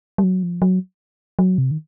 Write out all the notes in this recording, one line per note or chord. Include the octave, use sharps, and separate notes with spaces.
G3
F#3
F3
F#3
F#3
C3
D#3